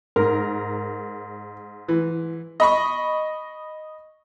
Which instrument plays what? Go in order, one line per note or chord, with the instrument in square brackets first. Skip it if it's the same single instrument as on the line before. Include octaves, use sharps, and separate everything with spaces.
[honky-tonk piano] G#2 [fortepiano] A#4
[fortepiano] E3
[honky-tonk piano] D#5 B5 C#6